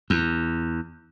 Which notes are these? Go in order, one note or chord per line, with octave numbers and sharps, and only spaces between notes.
E2